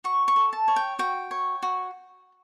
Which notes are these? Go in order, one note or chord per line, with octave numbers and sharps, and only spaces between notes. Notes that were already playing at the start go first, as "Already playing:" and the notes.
F#4 C#6
C#6
A4
A5
C#5
G5
F#4 G5
C#5
F#4